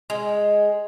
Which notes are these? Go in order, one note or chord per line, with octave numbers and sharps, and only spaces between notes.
G#3